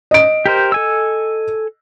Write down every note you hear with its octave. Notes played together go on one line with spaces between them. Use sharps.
D#5 D7
G4 A#4 C5
A4 G#5 E6